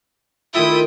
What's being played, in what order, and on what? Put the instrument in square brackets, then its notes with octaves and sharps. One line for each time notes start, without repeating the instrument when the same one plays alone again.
[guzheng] D#3 A3 A#5 [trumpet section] E4 [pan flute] F4 [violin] G5 D#6